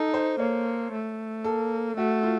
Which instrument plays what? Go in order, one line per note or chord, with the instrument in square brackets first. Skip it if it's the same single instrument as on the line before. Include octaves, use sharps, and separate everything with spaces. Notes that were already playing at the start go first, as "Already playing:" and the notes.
Already playing: [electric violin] D#4 [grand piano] A4
[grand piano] C5
[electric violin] A#3 [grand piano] C#5
[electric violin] A3
[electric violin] A#3 [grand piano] A4
[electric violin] A3 [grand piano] F#4
[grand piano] F4